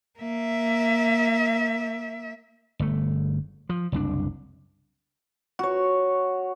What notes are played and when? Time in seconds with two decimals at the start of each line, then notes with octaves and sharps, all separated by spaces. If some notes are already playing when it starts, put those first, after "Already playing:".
0.19 A#3 E5
2.79 G1 A3
3.69 F3
3.92 F#1 C2 D4
5.59 F#4 C#5